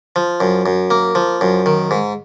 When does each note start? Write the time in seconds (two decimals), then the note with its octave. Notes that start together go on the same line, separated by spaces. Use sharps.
0.16 F3
0.40 F#2
0.66 F#2
0.90 A#3
1.15 F3
1.41 F#2
1.66 D#3
1.91 G#2